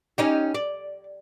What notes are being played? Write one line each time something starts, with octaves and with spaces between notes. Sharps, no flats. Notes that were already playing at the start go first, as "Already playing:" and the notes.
C#4 D#4 G4
D5